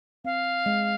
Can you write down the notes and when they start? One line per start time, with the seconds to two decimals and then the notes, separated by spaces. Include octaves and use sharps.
0.25 C4 F5
0.66 G#3